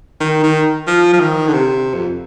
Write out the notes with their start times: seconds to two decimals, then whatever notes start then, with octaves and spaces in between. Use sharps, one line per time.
0.20 D#3
0.43 D#3
0.87 F3
1.13 F3
1.20 D#3
1.47 D3
1.53 C3
1.94 F2